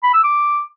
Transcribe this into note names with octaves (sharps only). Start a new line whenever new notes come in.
B5
E6
D6